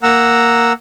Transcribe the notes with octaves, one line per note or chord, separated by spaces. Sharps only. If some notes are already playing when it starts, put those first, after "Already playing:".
A#3 F#5 A#5 E6